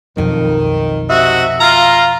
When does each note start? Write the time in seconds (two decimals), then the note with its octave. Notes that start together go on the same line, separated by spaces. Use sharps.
0.17 B1 F2 D#3
1.10 C3 F#4 D#5 E5
1.61 F4 F5 A#5